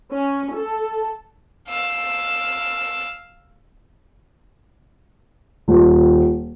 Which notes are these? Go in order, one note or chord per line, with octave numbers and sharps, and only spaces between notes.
C#4
A4
F5 E6
D#1